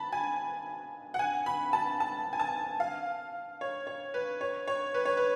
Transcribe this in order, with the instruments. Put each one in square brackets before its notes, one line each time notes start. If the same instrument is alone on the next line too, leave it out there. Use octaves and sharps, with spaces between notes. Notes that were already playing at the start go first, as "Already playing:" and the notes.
Already playing: [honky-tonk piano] A5 B5
G#5
F#5
G#5
B5
A5
A5
G#5
A5
F5
C#5
C#5
B4
C#5
C#5
B4
C#5
B4